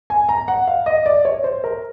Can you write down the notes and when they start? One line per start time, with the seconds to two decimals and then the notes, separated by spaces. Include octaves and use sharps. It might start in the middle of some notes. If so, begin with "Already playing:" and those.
0.10 G#5
0.29 A#5
0.48 F#5
0.67 F5
0.86 D#5
1.06 D5
1.25 C#5
1.44 C5
1.64 A#4